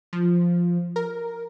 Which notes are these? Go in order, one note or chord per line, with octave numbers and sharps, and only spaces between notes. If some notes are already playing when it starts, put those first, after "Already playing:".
F3
A#4